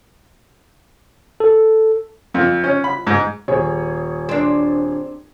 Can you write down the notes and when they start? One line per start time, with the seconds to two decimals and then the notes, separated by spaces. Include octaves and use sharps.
1.40 A4
2.34 F2
2.64 C#4
2.84 B5
3.07 G#2
3.48 D#1 G#4 C#5
4.29 C4 D4